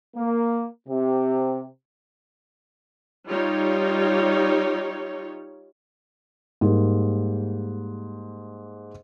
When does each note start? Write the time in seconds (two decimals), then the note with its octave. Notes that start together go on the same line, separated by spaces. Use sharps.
0.16 A#3
0.87 C3
3.28 G3 D#4 F4 C#5
6.61 G#2 G3 A#3